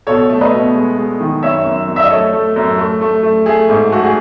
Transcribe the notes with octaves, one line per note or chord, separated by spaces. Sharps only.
B2 A4 C#5
A3
B4 D#5
B2
G#3
G#3
D#3
F#2 C#5 E5
F#2
F#2
E5
D#5
A3 A4 C#5
A3
F#2
A3
A3
A3
A3 G#4
G#2
A3 F#4
G#4